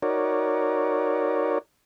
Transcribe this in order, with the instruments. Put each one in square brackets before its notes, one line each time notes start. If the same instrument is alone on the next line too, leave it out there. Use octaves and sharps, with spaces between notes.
[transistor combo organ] D#4 F#4 A#4 C#5 D5